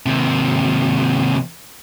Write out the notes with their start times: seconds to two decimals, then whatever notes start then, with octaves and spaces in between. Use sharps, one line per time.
0.06 D#2 C3